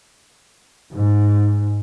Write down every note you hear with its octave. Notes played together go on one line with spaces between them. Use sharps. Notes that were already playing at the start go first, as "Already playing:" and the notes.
G#2